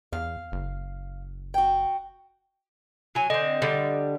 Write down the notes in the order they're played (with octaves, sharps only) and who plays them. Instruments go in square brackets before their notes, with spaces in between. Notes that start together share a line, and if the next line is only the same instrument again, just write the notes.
[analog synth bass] E2 [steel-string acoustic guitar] F5
[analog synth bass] F#1
[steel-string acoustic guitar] F#4 G5
[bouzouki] F#3 G#5
[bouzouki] D3 C4 [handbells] D#5
[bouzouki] D3 G3